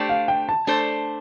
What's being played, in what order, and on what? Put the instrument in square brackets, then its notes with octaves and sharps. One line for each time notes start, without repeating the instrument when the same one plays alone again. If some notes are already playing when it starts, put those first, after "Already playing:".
Already playing: [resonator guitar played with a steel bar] A3 D4 G4 C5
[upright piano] F5
G5
A5
[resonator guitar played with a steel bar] A3 D4 A4 C5